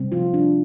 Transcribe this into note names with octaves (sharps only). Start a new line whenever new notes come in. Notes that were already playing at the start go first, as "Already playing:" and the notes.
Already playing: C3 G3 C4
F3 F4
D4